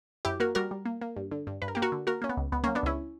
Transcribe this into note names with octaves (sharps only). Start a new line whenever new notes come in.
F#2 E4 G4
A#3 F#4 A#4
G3 F#4 A#4
G3
A#3
A#3
G2
D3
G2
G2 B4
A#4
A#3 G4
F#4 A#4
D3
A#3 F#4 A#4
A#3 C#4
B3
C#2
C#2 B3
F#3 A#3 C#4
B3 D4
C#2 C#4 E4